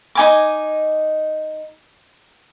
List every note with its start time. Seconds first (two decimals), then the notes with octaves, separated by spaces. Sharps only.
0.15 D#4 G#5 D6